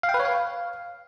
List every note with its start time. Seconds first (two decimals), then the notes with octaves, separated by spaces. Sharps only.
0.03 F5
0.09 G5
0.14 B4
0.20 C#5
0.25 F5